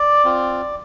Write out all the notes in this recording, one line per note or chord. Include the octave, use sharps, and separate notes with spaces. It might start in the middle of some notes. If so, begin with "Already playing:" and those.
Already playing: D5
C4 F4